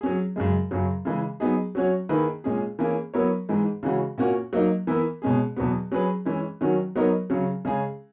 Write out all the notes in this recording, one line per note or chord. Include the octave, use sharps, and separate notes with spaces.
F#3 C#4 G#4
F#2 C#3 G#3
F#2 C#3 F#3
C#3 E3 G#3
F#3 B3 D#4 G#4
F#3 C#4 F#4 C#5
D#3 A#3 E4 G#4 B4
A#2 G#3 C#4 G#4
E3 A#3 C#4 G#4
F#3 B3 E4 A#4 C#5
G#2 E3 G#3
C#3 E3 G#3 C#4 F#4
A#2 A#3 C#4 F#4 C#5
F#3 A#3 D#4
E3 B3 E4 A#4
B2 G#3 C#4 G#4
E2 B2 F#3 B3
F#3 C#4 G#4 B4
E3 G#3 C#4
D#3 F#3 C#4 F#4
F#3 B3 D#4 A#4 C#5
C#3 F#3 C#4
C#3 G#3 C#4 G#4